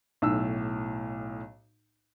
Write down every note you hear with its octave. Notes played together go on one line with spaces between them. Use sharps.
B1 A2 E6